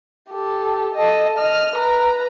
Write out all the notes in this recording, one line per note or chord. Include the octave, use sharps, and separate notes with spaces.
G4 A4
A4 D#5
D#5 F6
B4 A#5